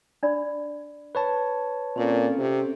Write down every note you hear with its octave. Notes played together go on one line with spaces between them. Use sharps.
D4 D5 B5
B4 C#5 A5
A#2 C4 C#4 A4
C3